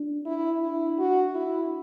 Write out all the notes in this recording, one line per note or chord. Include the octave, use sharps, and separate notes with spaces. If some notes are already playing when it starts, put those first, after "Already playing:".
Already playing: D4
E4
E4
F#4
E4